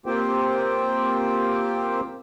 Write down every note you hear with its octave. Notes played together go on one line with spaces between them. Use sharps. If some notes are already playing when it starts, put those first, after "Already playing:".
A#3 C4 F4 G4 C5 G5